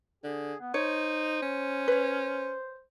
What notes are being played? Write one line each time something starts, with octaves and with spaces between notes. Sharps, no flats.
D3 G#4
B3
D#4 C5 C#5
C#4
B4 C#5